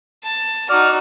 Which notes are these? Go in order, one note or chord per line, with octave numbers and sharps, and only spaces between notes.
A5
D#4 F#4 D5 F6